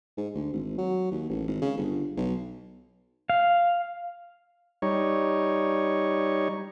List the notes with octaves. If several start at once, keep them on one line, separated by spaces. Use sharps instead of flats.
G#2
D2
G#1
F#3
D#2
A1
G#1
C#3
G1
B1
F5
G3 D#4 C#5